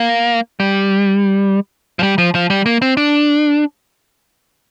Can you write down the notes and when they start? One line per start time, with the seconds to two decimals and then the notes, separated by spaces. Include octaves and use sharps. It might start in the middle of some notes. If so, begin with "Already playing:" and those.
Already playing: A#3
0.60 G3
1.99 F3
2.03 G3
2.18 F3
2.35 F3
2.50 G3
2.66 A#3
2.82 C4
2.97 D4